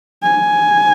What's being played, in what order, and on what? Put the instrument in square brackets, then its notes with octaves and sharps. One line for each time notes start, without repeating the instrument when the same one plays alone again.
[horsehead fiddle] G#5